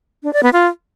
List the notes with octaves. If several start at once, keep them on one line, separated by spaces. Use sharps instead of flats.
D4
D5
B3
F4